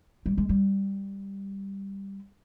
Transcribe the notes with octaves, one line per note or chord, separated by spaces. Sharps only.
G3
G#3
G3